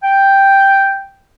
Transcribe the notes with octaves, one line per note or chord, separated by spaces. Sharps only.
G5